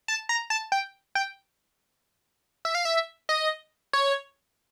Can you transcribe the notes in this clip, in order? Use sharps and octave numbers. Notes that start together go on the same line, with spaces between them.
A5
A#5
A5
G5
G5
E5
F5
E5
D#5
C#5